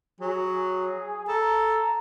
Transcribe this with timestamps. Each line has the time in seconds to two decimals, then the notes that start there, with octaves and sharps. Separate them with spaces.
0.21 F#3 G#4
1.28 A4 A#5